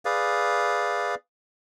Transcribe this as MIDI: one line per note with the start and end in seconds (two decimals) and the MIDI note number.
0.05 1.15 68
0.05 1.15 71
0.05 1.15 74
0.05 1.15 77